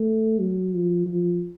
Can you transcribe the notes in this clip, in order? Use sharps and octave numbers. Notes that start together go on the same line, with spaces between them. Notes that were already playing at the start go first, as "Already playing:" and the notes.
Already playing: A3
F#3
F3
F3